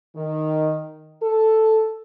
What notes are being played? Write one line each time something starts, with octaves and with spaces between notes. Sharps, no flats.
D#3
A4